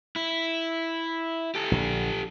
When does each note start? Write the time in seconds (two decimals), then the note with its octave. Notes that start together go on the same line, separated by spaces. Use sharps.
0.16 E4
1.55 G4 A4
1.71 A#1 D3